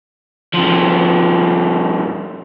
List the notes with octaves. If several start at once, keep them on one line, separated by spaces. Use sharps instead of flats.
G2 F3